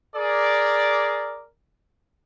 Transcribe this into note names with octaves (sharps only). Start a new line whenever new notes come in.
G#4 A#4 D5